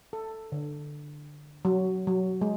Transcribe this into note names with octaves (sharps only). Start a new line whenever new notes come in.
A4
D3
F#3
F#3
G#3